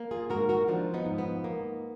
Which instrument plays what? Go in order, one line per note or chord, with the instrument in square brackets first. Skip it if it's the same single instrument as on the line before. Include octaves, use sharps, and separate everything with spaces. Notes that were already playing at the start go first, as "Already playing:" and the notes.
Already playing: [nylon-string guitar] A#3
F4 G#4
G#2 F#4 A#4
F#4 A#4
F3 D4 F4
B3 D#4
G#2
B3
A#3